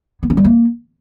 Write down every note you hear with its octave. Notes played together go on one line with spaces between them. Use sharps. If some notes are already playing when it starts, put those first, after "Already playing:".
B3
C#4
G3
A#3